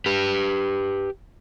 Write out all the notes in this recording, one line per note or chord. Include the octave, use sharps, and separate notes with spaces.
G4 B4